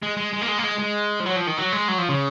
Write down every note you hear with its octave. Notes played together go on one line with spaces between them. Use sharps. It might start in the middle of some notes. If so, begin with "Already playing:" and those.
G#3
G#3
G#3
A#3
G#3
A#3
G#3
G#3
F3
F#3
F3
D#3
F#3
G#3
F#3
F3
C#3